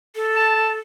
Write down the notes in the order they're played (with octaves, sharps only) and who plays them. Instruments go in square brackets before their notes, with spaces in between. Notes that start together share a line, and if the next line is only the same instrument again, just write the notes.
[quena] A4
[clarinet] A5